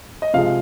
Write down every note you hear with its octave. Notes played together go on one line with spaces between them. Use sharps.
D#5
C3 F3 G#3 F5